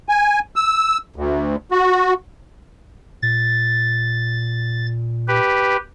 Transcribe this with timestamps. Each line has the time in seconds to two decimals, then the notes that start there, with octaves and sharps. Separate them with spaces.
0.09 G#5
0.56 E6
1.16 D2
1.71 F#4
3.22 A#2 A6
5.28 G4 B4